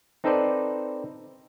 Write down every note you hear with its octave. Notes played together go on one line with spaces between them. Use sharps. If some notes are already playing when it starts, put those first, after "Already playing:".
C4 D#4 A4 B4 C5 D5